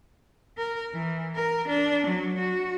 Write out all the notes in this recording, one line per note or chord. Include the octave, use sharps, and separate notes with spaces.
A#4
E3
A#4
D4
F#3
F#4